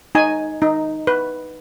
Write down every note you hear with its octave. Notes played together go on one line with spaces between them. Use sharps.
D#4 G#5
D#4
B4